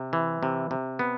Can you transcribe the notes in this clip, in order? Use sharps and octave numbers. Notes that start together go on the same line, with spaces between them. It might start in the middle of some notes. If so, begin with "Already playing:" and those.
Already playing: C3
E3
C3
C3
B3